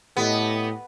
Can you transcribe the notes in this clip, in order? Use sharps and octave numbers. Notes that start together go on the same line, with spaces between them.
A2 B3 G4 A4 D#5